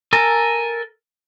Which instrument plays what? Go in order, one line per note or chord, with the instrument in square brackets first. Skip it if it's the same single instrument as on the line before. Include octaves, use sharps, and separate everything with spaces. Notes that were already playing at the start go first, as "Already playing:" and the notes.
[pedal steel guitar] A4 A#4 G#5